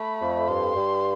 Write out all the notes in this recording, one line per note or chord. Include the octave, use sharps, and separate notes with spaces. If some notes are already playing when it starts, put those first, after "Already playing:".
Already playing: A3 B5
F2
G2 C6
G2